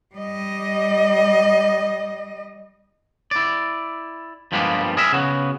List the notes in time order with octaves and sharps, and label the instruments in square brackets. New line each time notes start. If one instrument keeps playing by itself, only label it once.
[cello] G3 D#5
[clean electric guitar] E4 D5
G2 F3 G3 G#3 A#3 B3
G#4 A#4 E5
C#3 B3 F#4